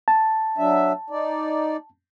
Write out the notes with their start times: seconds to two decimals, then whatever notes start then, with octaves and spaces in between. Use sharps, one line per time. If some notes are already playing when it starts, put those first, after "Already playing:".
0.08 A5
0.58 F#3 D4 E5
1.10 D#4 D5